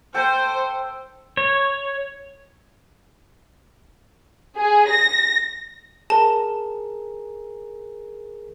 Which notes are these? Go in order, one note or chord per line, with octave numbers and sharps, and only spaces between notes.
A4 C5 G5
C#5
G#4
A#6
G#4 A#4 A5